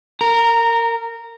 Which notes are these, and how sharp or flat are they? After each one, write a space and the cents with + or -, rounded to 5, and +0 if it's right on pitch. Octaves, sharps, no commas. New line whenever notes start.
A#4 -20 A#5 +0